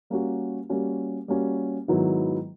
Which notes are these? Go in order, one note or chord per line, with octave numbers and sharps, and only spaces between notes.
G3 A#3 C#4 F#4
G3 A#3 C#4 F#4
G3 A#3 C#4 F#4
G#2 D#3 F#3 B3 E4